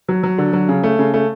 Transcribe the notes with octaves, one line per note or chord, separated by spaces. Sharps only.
F#3
F#3
D3
F#3
C#3
A3
C#3
A3